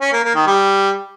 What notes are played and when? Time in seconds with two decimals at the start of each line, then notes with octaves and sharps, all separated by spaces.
0.01 C#4
0.12 A#3
0.24 A#3
0.35 D#3
0.46 G3